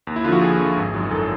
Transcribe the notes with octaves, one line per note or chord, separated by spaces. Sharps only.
D#2
E4
D3 F3 F4 F#4
D#2 G#4
D3 F3
G#1
F#2 D#3 F#3
G#1 A4